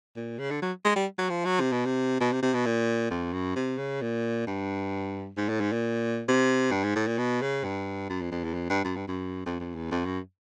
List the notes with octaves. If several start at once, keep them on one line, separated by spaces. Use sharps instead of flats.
A#2
C#3
D3
F#3
G#3
G3
F#3
F3
F#3
C3
B2
C3
B2
C3
C3
B2
A#2
F2
F#2
C3
C#3
A#2
G2
G#2
A2
G#2
A#2
C3
G2
G#2
A2
A#2
B2
C#3
G2
F#2
F2
F2
E2
F2
G2
F#2
G2
F#2
F2
F2
E2
F2
F#2